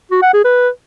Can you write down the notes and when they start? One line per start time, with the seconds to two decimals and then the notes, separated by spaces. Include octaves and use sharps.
0.11 F#4
0.22 F#5
0.33 G#4
0.45 B4